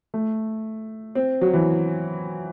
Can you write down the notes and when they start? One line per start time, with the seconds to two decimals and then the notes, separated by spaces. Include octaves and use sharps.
0.14 A3
1.15 C4
1.41 F#3
1.54 E3